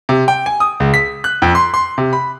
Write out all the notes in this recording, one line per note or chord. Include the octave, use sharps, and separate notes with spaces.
C3
G5
G#5
D#6
C#2
B6
F#6
F2
C6
C6
C3
B5